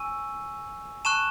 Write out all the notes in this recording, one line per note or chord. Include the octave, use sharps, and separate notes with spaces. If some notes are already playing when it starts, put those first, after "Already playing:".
Already playing: G#5 C#6 E6 D#7
A5 C#6 F#6 E7